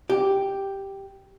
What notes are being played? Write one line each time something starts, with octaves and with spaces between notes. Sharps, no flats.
G4